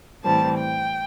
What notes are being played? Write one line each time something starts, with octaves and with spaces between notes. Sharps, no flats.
A2 E3 G3 C4 A5
G5